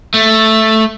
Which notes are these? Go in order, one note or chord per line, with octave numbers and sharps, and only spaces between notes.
A3